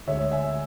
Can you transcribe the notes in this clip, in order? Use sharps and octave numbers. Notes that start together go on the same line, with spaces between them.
D2 D3 G#3 C#5 E5
E5 G#5